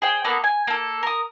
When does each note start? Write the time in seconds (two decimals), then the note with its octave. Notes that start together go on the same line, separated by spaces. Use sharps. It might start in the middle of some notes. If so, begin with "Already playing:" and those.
0.02 G#4 C5 G5
0.24 A#3 B3 F#4 A4
0.44 G#5
0.67 A#3 A4
1.03 A#4 D#6